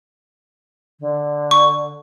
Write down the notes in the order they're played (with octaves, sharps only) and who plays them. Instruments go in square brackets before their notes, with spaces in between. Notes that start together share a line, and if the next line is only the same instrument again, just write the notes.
[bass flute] D3
[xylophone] C#6